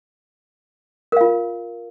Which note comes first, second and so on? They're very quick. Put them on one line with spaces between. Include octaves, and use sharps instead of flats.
A#4 F5 F4